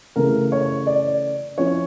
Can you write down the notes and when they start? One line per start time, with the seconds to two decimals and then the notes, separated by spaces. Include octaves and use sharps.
0.16 C#3 E3 A3 A#4
0.52 C#5
0.87 D5
1.58 F3 C#4 E4 C#5